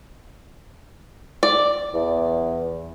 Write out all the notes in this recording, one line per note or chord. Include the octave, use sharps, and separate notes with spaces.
D5
E2